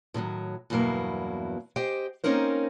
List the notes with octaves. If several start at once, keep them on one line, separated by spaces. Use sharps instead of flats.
A2 D3 D#3 F#3
E2 G2 B2 F#3 A#3 E4
G4 C5 D#5 G5
A#3 C4 C#4 D#4 A#4 C5